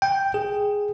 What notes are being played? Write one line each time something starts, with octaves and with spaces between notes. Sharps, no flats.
G5
G#4